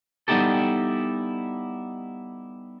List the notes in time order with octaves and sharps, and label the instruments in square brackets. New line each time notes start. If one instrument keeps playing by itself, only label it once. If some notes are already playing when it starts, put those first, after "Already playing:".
[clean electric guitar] G3 B3 D#4 E4 G4 A4